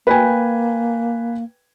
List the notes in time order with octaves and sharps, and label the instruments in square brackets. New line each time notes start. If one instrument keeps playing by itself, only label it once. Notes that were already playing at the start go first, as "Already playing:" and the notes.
[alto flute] A#3 [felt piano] B4 G5 G#5